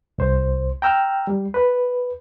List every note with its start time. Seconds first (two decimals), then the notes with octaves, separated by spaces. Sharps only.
0.18 C2 C5
0.82 G5 A#5 E6 F6
1.27 G3
1.54 B4